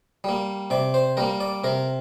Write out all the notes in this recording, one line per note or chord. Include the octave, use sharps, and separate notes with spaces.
G3 A#3
C3 D5
C5
G3 A#3 A#4
D5
C3 A#4